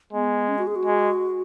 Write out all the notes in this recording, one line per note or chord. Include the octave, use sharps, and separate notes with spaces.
G#3 B3
C#4
F#4
G#4
F#4
G#3